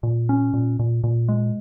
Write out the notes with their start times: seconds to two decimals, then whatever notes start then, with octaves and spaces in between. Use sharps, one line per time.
0.03 A#2
0.29 C#4
0.54 A#2
0.79 A#2
1.04 A#2
1.28 G#3